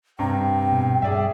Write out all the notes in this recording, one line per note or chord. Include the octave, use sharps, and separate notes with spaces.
G2 C3 G5 A#5
B2
G2 G#4 D5 E5